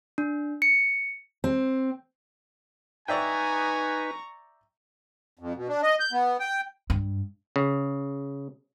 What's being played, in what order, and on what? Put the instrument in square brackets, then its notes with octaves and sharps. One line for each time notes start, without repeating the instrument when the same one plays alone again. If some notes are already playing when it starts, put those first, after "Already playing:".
[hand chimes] D4
C#7
[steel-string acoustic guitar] C4
[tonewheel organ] D#4 B4 [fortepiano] D5 E5 G5 [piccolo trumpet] G#5 [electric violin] A#5 C#6
[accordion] F2
B2
D4
D#5
G6
B3
G5
[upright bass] G2
[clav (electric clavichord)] C#3